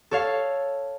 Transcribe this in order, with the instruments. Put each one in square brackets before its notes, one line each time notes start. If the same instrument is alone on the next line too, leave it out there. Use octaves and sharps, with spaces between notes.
[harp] A4 C#5 F5